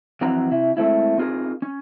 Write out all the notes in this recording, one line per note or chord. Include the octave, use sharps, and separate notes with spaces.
F2 E3 F#3 C4 F#5 A#5
C3 E4
G#3 A3 C4 E4
C4 D#4 F4 F#4 G#4 A#4
C#4